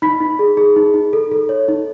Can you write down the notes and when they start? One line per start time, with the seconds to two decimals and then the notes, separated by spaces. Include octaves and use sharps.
0.02 D#4 B5 B6
0.20 D#4
0.39 G#4
0.57 G#4
0.76 D#4
0.94 D#4
1.13 A4
1.31 A4
1.49 C#5
1.68 D#4